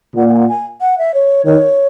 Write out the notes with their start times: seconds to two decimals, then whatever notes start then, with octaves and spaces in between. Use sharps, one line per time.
0.16 A#2 F#5
0.28 F#5
0.34 G#5
0.39 F#5
0.49 G#5
0.81 F#5
0.98 E5
1.14 C#5
1.46 D#3 C#5